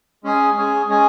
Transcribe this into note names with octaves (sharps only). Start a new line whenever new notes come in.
G#3 C#4 G#4 D#5 G#5
G#3 C#4 G#4 D#5 G#5
G#3 C#4 G#4 D#5 G#5